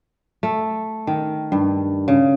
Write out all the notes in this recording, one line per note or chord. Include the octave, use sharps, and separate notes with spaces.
A3
D#3
G2
C#3